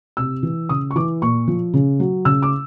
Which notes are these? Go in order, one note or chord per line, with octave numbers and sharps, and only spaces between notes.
C3 E6
E3
C#3 D#6
C#6
E3 D6
A#2 C#6
F3
C#3
F#3
C#3 E6
D6